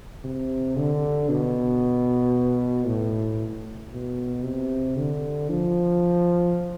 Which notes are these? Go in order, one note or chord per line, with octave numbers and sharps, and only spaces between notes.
C3
D3
B2
A2
B2
C3
D3
F3